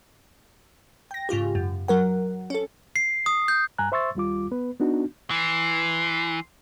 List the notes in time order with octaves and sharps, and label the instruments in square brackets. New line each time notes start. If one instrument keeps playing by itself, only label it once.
[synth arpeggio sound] G5 A#6
G#2 C#3 F4 G4
F#2
F#3 A#4 F#5
C#4 A4
[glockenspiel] C7
D#6
G6
[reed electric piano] G2 G#5 A#5 F#6
C5 E5 C6 C#6 E6 A6
D#2 G3 F4 D6
B3 B4
B3 D4 D#4 F#4
[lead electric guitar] E3 [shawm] C6